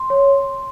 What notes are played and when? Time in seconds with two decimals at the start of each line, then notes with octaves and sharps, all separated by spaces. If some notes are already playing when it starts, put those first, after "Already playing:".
Already playing: C6
0.10 C#5